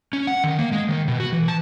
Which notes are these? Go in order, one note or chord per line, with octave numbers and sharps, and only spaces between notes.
C#4
F#5
D#3
A#3
G#3
D#3
B2
F#4
E3
A5